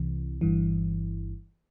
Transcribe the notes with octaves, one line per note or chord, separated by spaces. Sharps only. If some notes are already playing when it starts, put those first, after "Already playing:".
Already playing: C2 C3 E3
G1 G2 E3